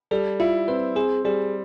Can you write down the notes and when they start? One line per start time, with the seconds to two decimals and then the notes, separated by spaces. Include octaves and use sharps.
0.11 G3 A4
0.40 E4 F4
0.68 C4 B4
0.96 C4 G#4
1.25 G3 G#4